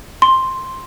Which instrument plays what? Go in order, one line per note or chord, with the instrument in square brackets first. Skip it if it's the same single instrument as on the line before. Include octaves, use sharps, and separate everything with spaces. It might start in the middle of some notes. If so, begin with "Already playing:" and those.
[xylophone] C6